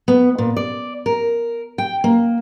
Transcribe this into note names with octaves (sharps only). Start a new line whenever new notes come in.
B3
A#2
D5
A#4
G5
A#3